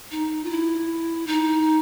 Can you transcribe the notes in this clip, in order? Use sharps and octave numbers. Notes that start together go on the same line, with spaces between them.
D#4
F4
E4
D#4